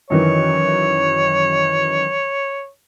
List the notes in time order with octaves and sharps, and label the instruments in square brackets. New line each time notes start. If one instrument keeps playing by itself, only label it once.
[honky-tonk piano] F#2 D#3 E3 [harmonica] C#5